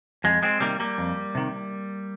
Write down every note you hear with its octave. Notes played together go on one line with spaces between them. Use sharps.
F2 G#3
G#3 C4
C3 D#3 G3 A#3
G3 A#3
F2
C3 D#3